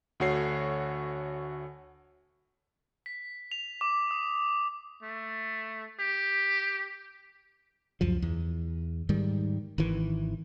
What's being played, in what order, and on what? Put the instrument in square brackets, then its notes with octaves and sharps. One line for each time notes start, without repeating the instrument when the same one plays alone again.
[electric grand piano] D2 A3 F#4 C#5 C7
[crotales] B6
F7
D6
D#6
[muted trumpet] A3
G4
[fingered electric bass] C#2 F#2 F3
E2
G#2 D#3 G3
G#1 D#3 E3